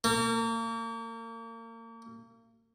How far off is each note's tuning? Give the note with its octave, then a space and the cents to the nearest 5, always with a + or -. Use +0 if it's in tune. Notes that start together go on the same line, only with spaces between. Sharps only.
A#3 -35